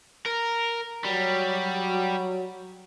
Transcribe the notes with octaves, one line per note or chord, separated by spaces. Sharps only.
A#4
F#3 G3